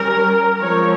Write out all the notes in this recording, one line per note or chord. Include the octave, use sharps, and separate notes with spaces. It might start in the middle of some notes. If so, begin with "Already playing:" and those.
Already playing: G3 C#4 A#4
F3 G#3 C4 C#5